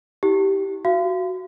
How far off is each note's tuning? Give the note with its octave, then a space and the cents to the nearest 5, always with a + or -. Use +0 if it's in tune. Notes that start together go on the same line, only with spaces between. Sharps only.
E4 -40 G4 -10
F#4 +0 F5 -35